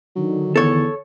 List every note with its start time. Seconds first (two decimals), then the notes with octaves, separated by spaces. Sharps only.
0.16 D3 D#3 F#3
0.56 E2 A4 C#5